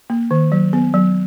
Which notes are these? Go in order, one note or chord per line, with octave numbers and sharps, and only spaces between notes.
A#3
D#3
F#3
B3
F#3